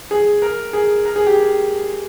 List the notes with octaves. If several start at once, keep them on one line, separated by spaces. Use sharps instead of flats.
G#4
A#4
G#4
A#4
G#4
G4